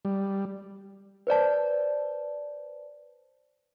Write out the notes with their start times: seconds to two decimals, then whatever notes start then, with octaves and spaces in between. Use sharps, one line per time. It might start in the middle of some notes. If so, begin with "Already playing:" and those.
0.05 G3
1.27 B4 C5 D5 A5